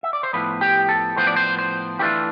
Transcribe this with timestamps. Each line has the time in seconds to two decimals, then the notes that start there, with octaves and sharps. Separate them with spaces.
0.03 E5
0.13 D5
0.23 C5
0.33 A2 F3 B3 B4
0.61 G4
0.89 A4
1.16 A2 F3 B3 C5
1.27 D5
1.36 C5
1.59 C5
1.99 E3 A3 D4 F4 G4